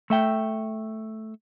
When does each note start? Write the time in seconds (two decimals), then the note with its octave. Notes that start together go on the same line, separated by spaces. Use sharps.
0.10 A3 E5 G5